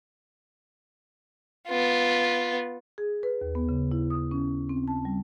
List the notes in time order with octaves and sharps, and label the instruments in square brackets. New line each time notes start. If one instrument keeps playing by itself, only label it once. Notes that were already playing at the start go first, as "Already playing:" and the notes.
[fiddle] B3 F4
[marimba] G#4
B4
D#2
B3
C#3
E4
D#6
C#4
C4
A5
G3